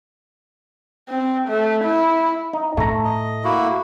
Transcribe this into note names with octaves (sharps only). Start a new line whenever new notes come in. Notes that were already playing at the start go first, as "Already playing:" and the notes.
C4
A3
E4
D#4
A2 A3 A#5
D#5
A#3 E4 F#4